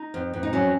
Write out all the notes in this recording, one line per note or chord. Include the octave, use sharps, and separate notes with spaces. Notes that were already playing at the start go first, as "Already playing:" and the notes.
Already playing: D#4
F2
F2
D#4
F#3 C#4